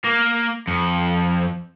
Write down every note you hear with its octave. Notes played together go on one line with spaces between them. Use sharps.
A#3
F2